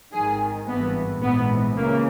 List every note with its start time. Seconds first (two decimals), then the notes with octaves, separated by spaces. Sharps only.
0.12 G#1 G#2 D#3 G#4
0.67 G#1 G2 E3 B3
1.22 A#1 G#2 E3 B3
1.77 C#2 C#3 E3 A#3